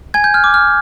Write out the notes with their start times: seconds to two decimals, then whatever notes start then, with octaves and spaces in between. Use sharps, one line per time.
0.14 G#5 G#6
0.24 G6
0.34 F6
0.44 D6
0.54 F6